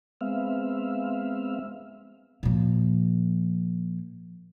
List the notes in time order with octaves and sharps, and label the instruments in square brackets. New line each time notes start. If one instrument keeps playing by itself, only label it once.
[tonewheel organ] G#3 B3 C4 E5 F5
[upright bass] A#2 F3